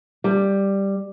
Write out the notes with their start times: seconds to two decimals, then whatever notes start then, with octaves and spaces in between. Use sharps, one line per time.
0.24 G3